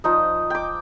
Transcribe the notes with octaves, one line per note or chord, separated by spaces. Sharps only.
F3 D#4 D#5
G5 D6